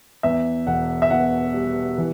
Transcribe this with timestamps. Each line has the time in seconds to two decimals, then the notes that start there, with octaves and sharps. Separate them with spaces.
0.23 E2 E5
0.67 E1 F#5
1.02 E5
1.10 B2 F#5
1.54 G3
1.98 E3